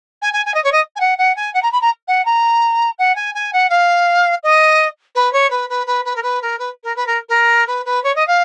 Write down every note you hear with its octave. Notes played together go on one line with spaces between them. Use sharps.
G#5
G#5
G#5
D#5
C#5
D#5
G#5
F#5
F#5
G#5
F#5
A#5
B5
A#5
F#5
A#5
F#5
G#5
G#5
F#5
F5
D#5
B4
C#5
B4
B4
B4
B4
A#4
B4
A#4
B4
A#4
B4
A#4
A#4
B4
B4
C#5
D#5
F5